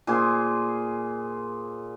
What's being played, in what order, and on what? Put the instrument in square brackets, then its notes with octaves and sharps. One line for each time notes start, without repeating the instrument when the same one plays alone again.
[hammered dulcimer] A#2 F4 G#4 C5